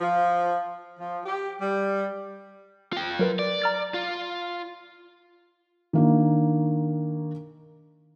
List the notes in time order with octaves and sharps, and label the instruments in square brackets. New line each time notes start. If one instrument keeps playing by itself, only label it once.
[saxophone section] F3
F3
G4
G3
[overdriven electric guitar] F4 G5
[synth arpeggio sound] F#3 A#4 B4
[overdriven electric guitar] D5
[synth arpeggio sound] A#5 F6 A6
[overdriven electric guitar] F4
[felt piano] D#3 A#3 D4